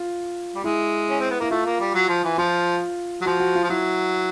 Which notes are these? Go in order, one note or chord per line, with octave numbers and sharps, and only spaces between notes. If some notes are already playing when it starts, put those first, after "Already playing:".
Already playing: F4
G3
G#3 E4
C#4
C4
B3
A#3 E4
A3 F4
A#3
G3
F#3
F3
E3
F3 F4
F#3
F3 F#4
F#4
F4
F3
F#3 E4